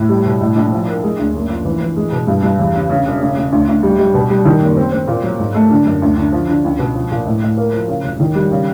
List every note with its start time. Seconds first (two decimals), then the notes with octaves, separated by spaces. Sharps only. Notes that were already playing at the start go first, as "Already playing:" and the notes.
Already playing: A2
0.09 G3
0.25 B2
0.41 A2
0.56 A#1
0.72 F3
0.87 A#3
1.03 G#3
1.19 D2
1.34 F#1
1.50 F3
1.65 E3
1.81 E3
1.96 G#3
2.12 B2
2.27 G2
2.43 G2
2.59 E2
2.74 C#3
2.90 C#3
3.06 E1
3.22 C#3
3.37 C#3
3.52 D2
3.68 D2
3.83 G3
3.98 G3
4.14 B2
4.30 G3
4.45 D#3
4.61 F#1
4.77 C4
4.92 C4
5.07 A#2
5.23 F#3
5.39 G#2
5.55 A3
5.70 D3
5.86 F#2
6.02 D2
6.17 D3
6.32 F3
6.48 D3
6.64 C#2
6.79 B2
6.95 F3
7.11 A#2
7.26 A2
7.42 A2
7.57 A#3
7.73 F3
7.88 C#3
8.03 E1
8.20 D#3
8.35 G3
8.51 C#3